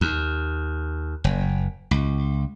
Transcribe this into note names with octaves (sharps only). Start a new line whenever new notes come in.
D#2
F#1
C#2